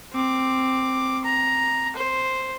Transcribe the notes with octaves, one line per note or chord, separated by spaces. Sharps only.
C4 D6
A#5
C5